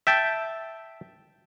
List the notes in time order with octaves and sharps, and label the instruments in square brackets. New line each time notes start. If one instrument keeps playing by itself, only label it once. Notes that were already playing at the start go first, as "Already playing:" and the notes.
[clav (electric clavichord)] E5 G5 A5